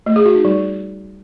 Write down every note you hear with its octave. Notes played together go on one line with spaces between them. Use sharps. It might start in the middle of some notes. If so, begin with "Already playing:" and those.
A3
G#4
F#4
D#4
G3